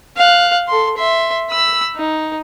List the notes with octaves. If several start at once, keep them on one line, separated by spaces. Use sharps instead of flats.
F5 F#6
A4 C6
E5 C6
B5 E6
D#4